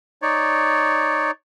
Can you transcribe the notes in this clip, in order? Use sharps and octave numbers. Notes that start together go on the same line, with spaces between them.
D#4 C#5 D5